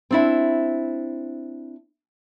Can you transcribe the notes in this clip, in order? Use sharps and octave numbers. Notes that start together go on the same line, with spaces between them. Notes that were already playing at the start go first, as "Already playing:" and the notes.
C4 D4 E4